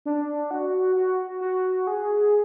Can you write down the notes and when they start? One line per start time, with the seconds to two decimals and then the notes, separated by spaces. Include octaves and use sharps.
0.06 D4
0.51 F#4
0.96 F#4
1.41 F#4
1.87 G#4